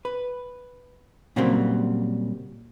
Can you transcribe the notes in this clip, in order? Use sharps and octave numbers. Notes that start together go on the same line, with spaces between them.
B4
A#2 C#3 F#3 G3 A#3 C4